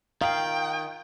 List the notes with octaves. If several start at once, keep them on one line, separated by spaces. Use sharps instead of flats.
D#3 F5 G5